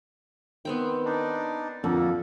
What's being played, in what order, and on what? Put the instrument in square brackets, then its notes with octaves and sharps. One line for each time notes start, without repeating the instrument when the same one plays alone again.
[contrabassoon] D#3 [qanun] B3 C4 G5
[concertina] D4 D#4 D5
[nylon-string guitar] F2 [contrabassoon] D3 [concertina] A#3 A4